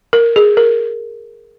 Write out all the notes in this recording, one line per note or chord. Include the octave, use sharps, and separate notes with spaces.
A#4
G#4
A#4